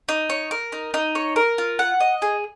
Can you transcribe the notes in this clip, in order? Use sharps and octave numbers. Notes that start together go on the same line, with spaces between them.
D#4
C#5
A#4
D#4
D#4
C#5
A#4
F4
F#5
D#5
G#4